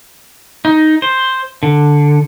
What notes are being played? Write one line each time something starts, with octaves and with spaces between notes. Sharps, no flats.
D#4
C5
D3